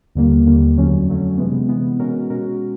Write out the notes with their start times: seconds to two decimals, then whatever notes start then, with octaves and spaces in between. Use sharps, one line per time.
0.15 D#2 D3 G3 A#3
0.46 D#2 D3 G3 A#3
0.77 F2 D3 F#3 A3 C#4
1.08 F2 D3 F#3 A3 C#4
1.38 C3 E3 G#3 B3
1.69 C3 E3 G#3 B3
2.00 B2 G#3 C#4 F#4 A#4
2.30 B2 G#3 C#4 F#4 A#4